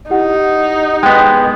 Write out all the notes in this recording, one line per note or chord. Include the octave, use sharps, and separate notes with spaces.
D#4 E4 G4 F#5
G#3 B3 G5